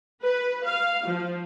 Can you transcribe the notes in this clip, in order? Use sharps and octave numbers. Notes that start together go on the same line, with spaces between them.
B4
F5
F3